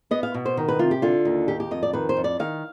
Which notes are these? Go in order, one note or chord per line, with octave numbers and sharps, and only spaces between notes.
B3 D#5
F5
B2
C5
D#3
B4
C3 F4
G4
D3 F4
D#2
D#3 G4
G4
F2 D#5
D5
D#3 B4
C5
F2
D5
D#3 F5